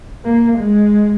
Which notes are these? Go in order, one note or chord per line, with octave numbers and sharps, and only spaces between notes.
A#3
G#3